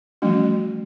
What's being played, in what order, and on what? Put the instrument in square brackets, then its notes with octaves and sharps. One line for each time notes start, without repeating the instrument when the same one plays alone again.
[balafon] E3 F3 G3 A3 C#4 F#4